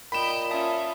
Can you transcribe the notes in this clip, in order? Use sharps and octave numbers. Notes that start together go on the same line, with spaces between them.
A#2 D#5 G5 B5 E7
C#4 F4 E5 A5 D#6